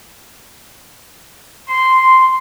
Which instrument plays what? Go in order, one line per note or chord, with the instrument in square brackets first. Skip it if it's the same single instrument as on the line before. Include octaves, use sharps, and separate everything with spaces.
[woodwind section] C6